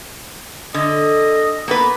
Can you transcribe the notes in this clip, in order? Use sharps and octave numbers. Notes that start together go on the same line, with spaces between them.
D3 D#5
A#3 B3 B4